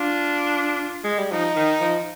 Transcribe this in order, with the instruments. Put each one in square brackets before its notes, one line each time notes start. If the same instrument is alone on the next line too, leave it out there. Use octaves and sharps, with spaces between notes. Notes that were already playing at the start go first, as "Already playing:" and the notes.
Already playing: [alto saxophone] D4 [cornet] F4
[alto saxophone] G#3
G3
[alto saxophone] F3 [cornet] D#4
[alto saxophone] D#3
F3